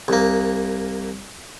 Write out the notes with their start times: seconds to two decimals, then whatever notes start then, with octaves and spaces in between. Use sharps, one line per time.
0.08 C2 A#3